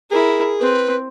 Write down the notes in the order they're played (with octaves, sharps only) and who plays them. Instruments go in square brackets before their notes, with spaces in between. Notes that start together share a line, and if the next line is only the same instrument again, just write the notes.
[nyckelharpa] E4 A#4 [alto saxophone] G#4
[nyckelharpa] C4 [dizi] B4